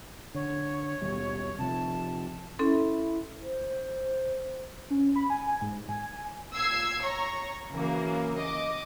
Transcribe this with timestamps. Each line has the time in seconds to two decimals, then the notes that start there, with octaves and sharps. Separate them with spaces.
0.35 D3 C#5
1.01 D#2 B2 G3
1.59 C3 F3 A5
2.59 C#4 E4 A4 C6
3.42 C5
4.90 C#4
5.16 B5
5.30 G#5
5.61 G#2
5.89 G#5
6.54 A#2 E6 G#6 C7
7.03 C#5 A#5 C#6
7.71 C#3 E3 F#3 A#3
8.37 D#5 D6